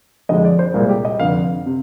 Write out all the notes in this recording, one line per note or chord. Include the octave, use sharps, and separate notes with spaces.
F2 D3 F3 G#3 D#5
D5
C5
C2 A#2 G#3 A#4
G4
D#5
F1 F2 D3 F5
C3